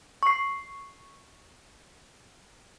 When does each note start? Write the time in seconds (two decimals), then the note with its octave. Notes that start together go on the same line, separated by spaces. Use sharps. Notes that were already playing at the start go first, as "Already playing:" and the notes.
0.23 C#6 C7